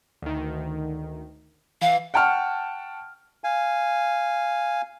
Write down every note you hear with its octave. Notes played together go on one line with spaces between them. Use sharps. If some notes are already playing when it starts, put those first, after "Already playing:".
D2 D#3
E3 F5
F#5 G5 A5 C#6 F6
F5 G#5